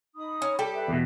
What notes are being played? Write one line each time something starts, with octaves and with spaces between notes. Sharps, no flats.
D#4 B5 D#6
C#4
G3 G4 A4
B4 E5 B5
E2 B2